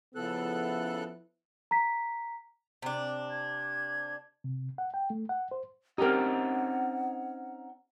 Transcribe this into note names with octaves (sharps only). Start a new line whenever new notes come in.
C#3 F3 B3 E4 A4 F#6
A#5 B6
C3 D4
G#6
C3
F#5
G5
A3
F#5
C5
C4 C#4 D#4 G4 A#4 F#5